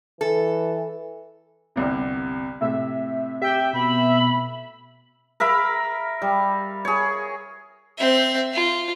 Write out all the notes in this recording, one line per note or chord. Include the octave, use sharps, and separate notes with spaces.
E3 A4
G1 C2 C3
A2 C3 E5
G4 E5 G5
B2 B5
A#4 E5 F5 B5
G3
G#4 C#5
C4 E5
F4